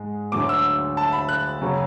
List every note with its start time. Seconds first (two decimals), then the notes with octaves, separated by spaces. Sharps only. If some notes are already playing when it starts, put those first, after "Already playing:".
Already playing: G#2 G#3
0.32 D2 D3 F#3 A3 D6
0.49 E6
0.97 A5
1.12 B5
1.29 F#6
1.61 F#2 C#3 F#3